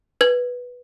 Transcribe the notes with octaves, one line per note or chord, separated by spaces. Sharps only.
B4 G#6